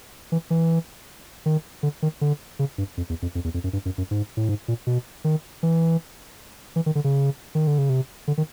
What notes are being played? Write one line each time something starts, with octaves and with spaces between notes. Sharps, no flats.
E3
E3
D#3
D3
D#3
D3
C#3
G2
F2
E2
F2
F2
E2
F2
F#2
G2
F#2
F#2
G#2
A2
G#2
A#2
B2
D#3
E3
E3
D#3
D3
C#3
D#3
D3
C#3
C3
D3
D#3